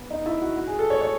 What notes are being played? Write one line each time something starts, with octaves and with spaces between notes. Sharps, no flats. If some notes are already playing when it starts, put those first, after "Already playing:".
Already playing: B3
D#4
E4
F#4
F#4
G#4
A4
C#5
C#5